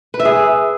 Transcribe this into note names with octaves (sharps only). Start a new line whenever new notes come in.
B4
E5
G#4